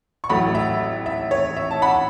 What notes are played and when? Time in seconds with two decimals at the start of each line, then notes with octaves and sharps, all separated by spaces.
0.24 C#6
0.29 A1 A2 F#3 A3 F#5 B5
0.55 E5
1.06 E5
1.31 C#5
1.57 E5
1.71 A5
1.82 F#5 B5